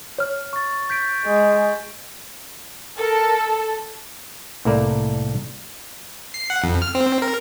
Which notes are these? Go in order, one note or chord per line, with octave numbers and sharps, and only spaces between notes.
C#5 F6
C#6 A6
G6 B6 D7
G#3
A4 A#4
C2 A2 A3 A#3 A#4 D5
C7
F#5
F2
F6
C4
A#4